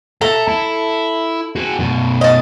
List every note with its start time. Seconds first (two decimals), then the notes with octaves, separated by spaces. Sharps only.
0.21 A4 E5 A#5
0.48 E4
1.56 F#4 G#4
1.79 F#2 B2
2.21 D#5 A5